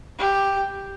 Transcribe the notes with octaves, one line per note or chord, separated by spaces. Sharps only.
G4